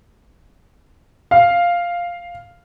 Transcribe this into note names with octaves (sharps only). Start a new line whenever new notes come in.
F5